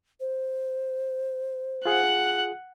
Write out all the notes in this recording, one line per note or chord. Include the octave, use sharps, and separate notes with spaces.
C5
F4 G#4 F#5 F#6